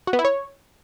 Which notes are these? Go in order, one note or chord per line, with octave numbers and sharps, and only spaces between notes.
F#4
B3
E4
C#5